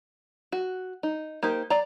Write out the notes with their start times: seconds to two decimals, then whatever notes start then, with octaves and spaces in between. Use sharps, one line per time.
0.52 F#4
1.03 D#4
1.43 A#3 D#4 G4 C5
1.70 D5 A#5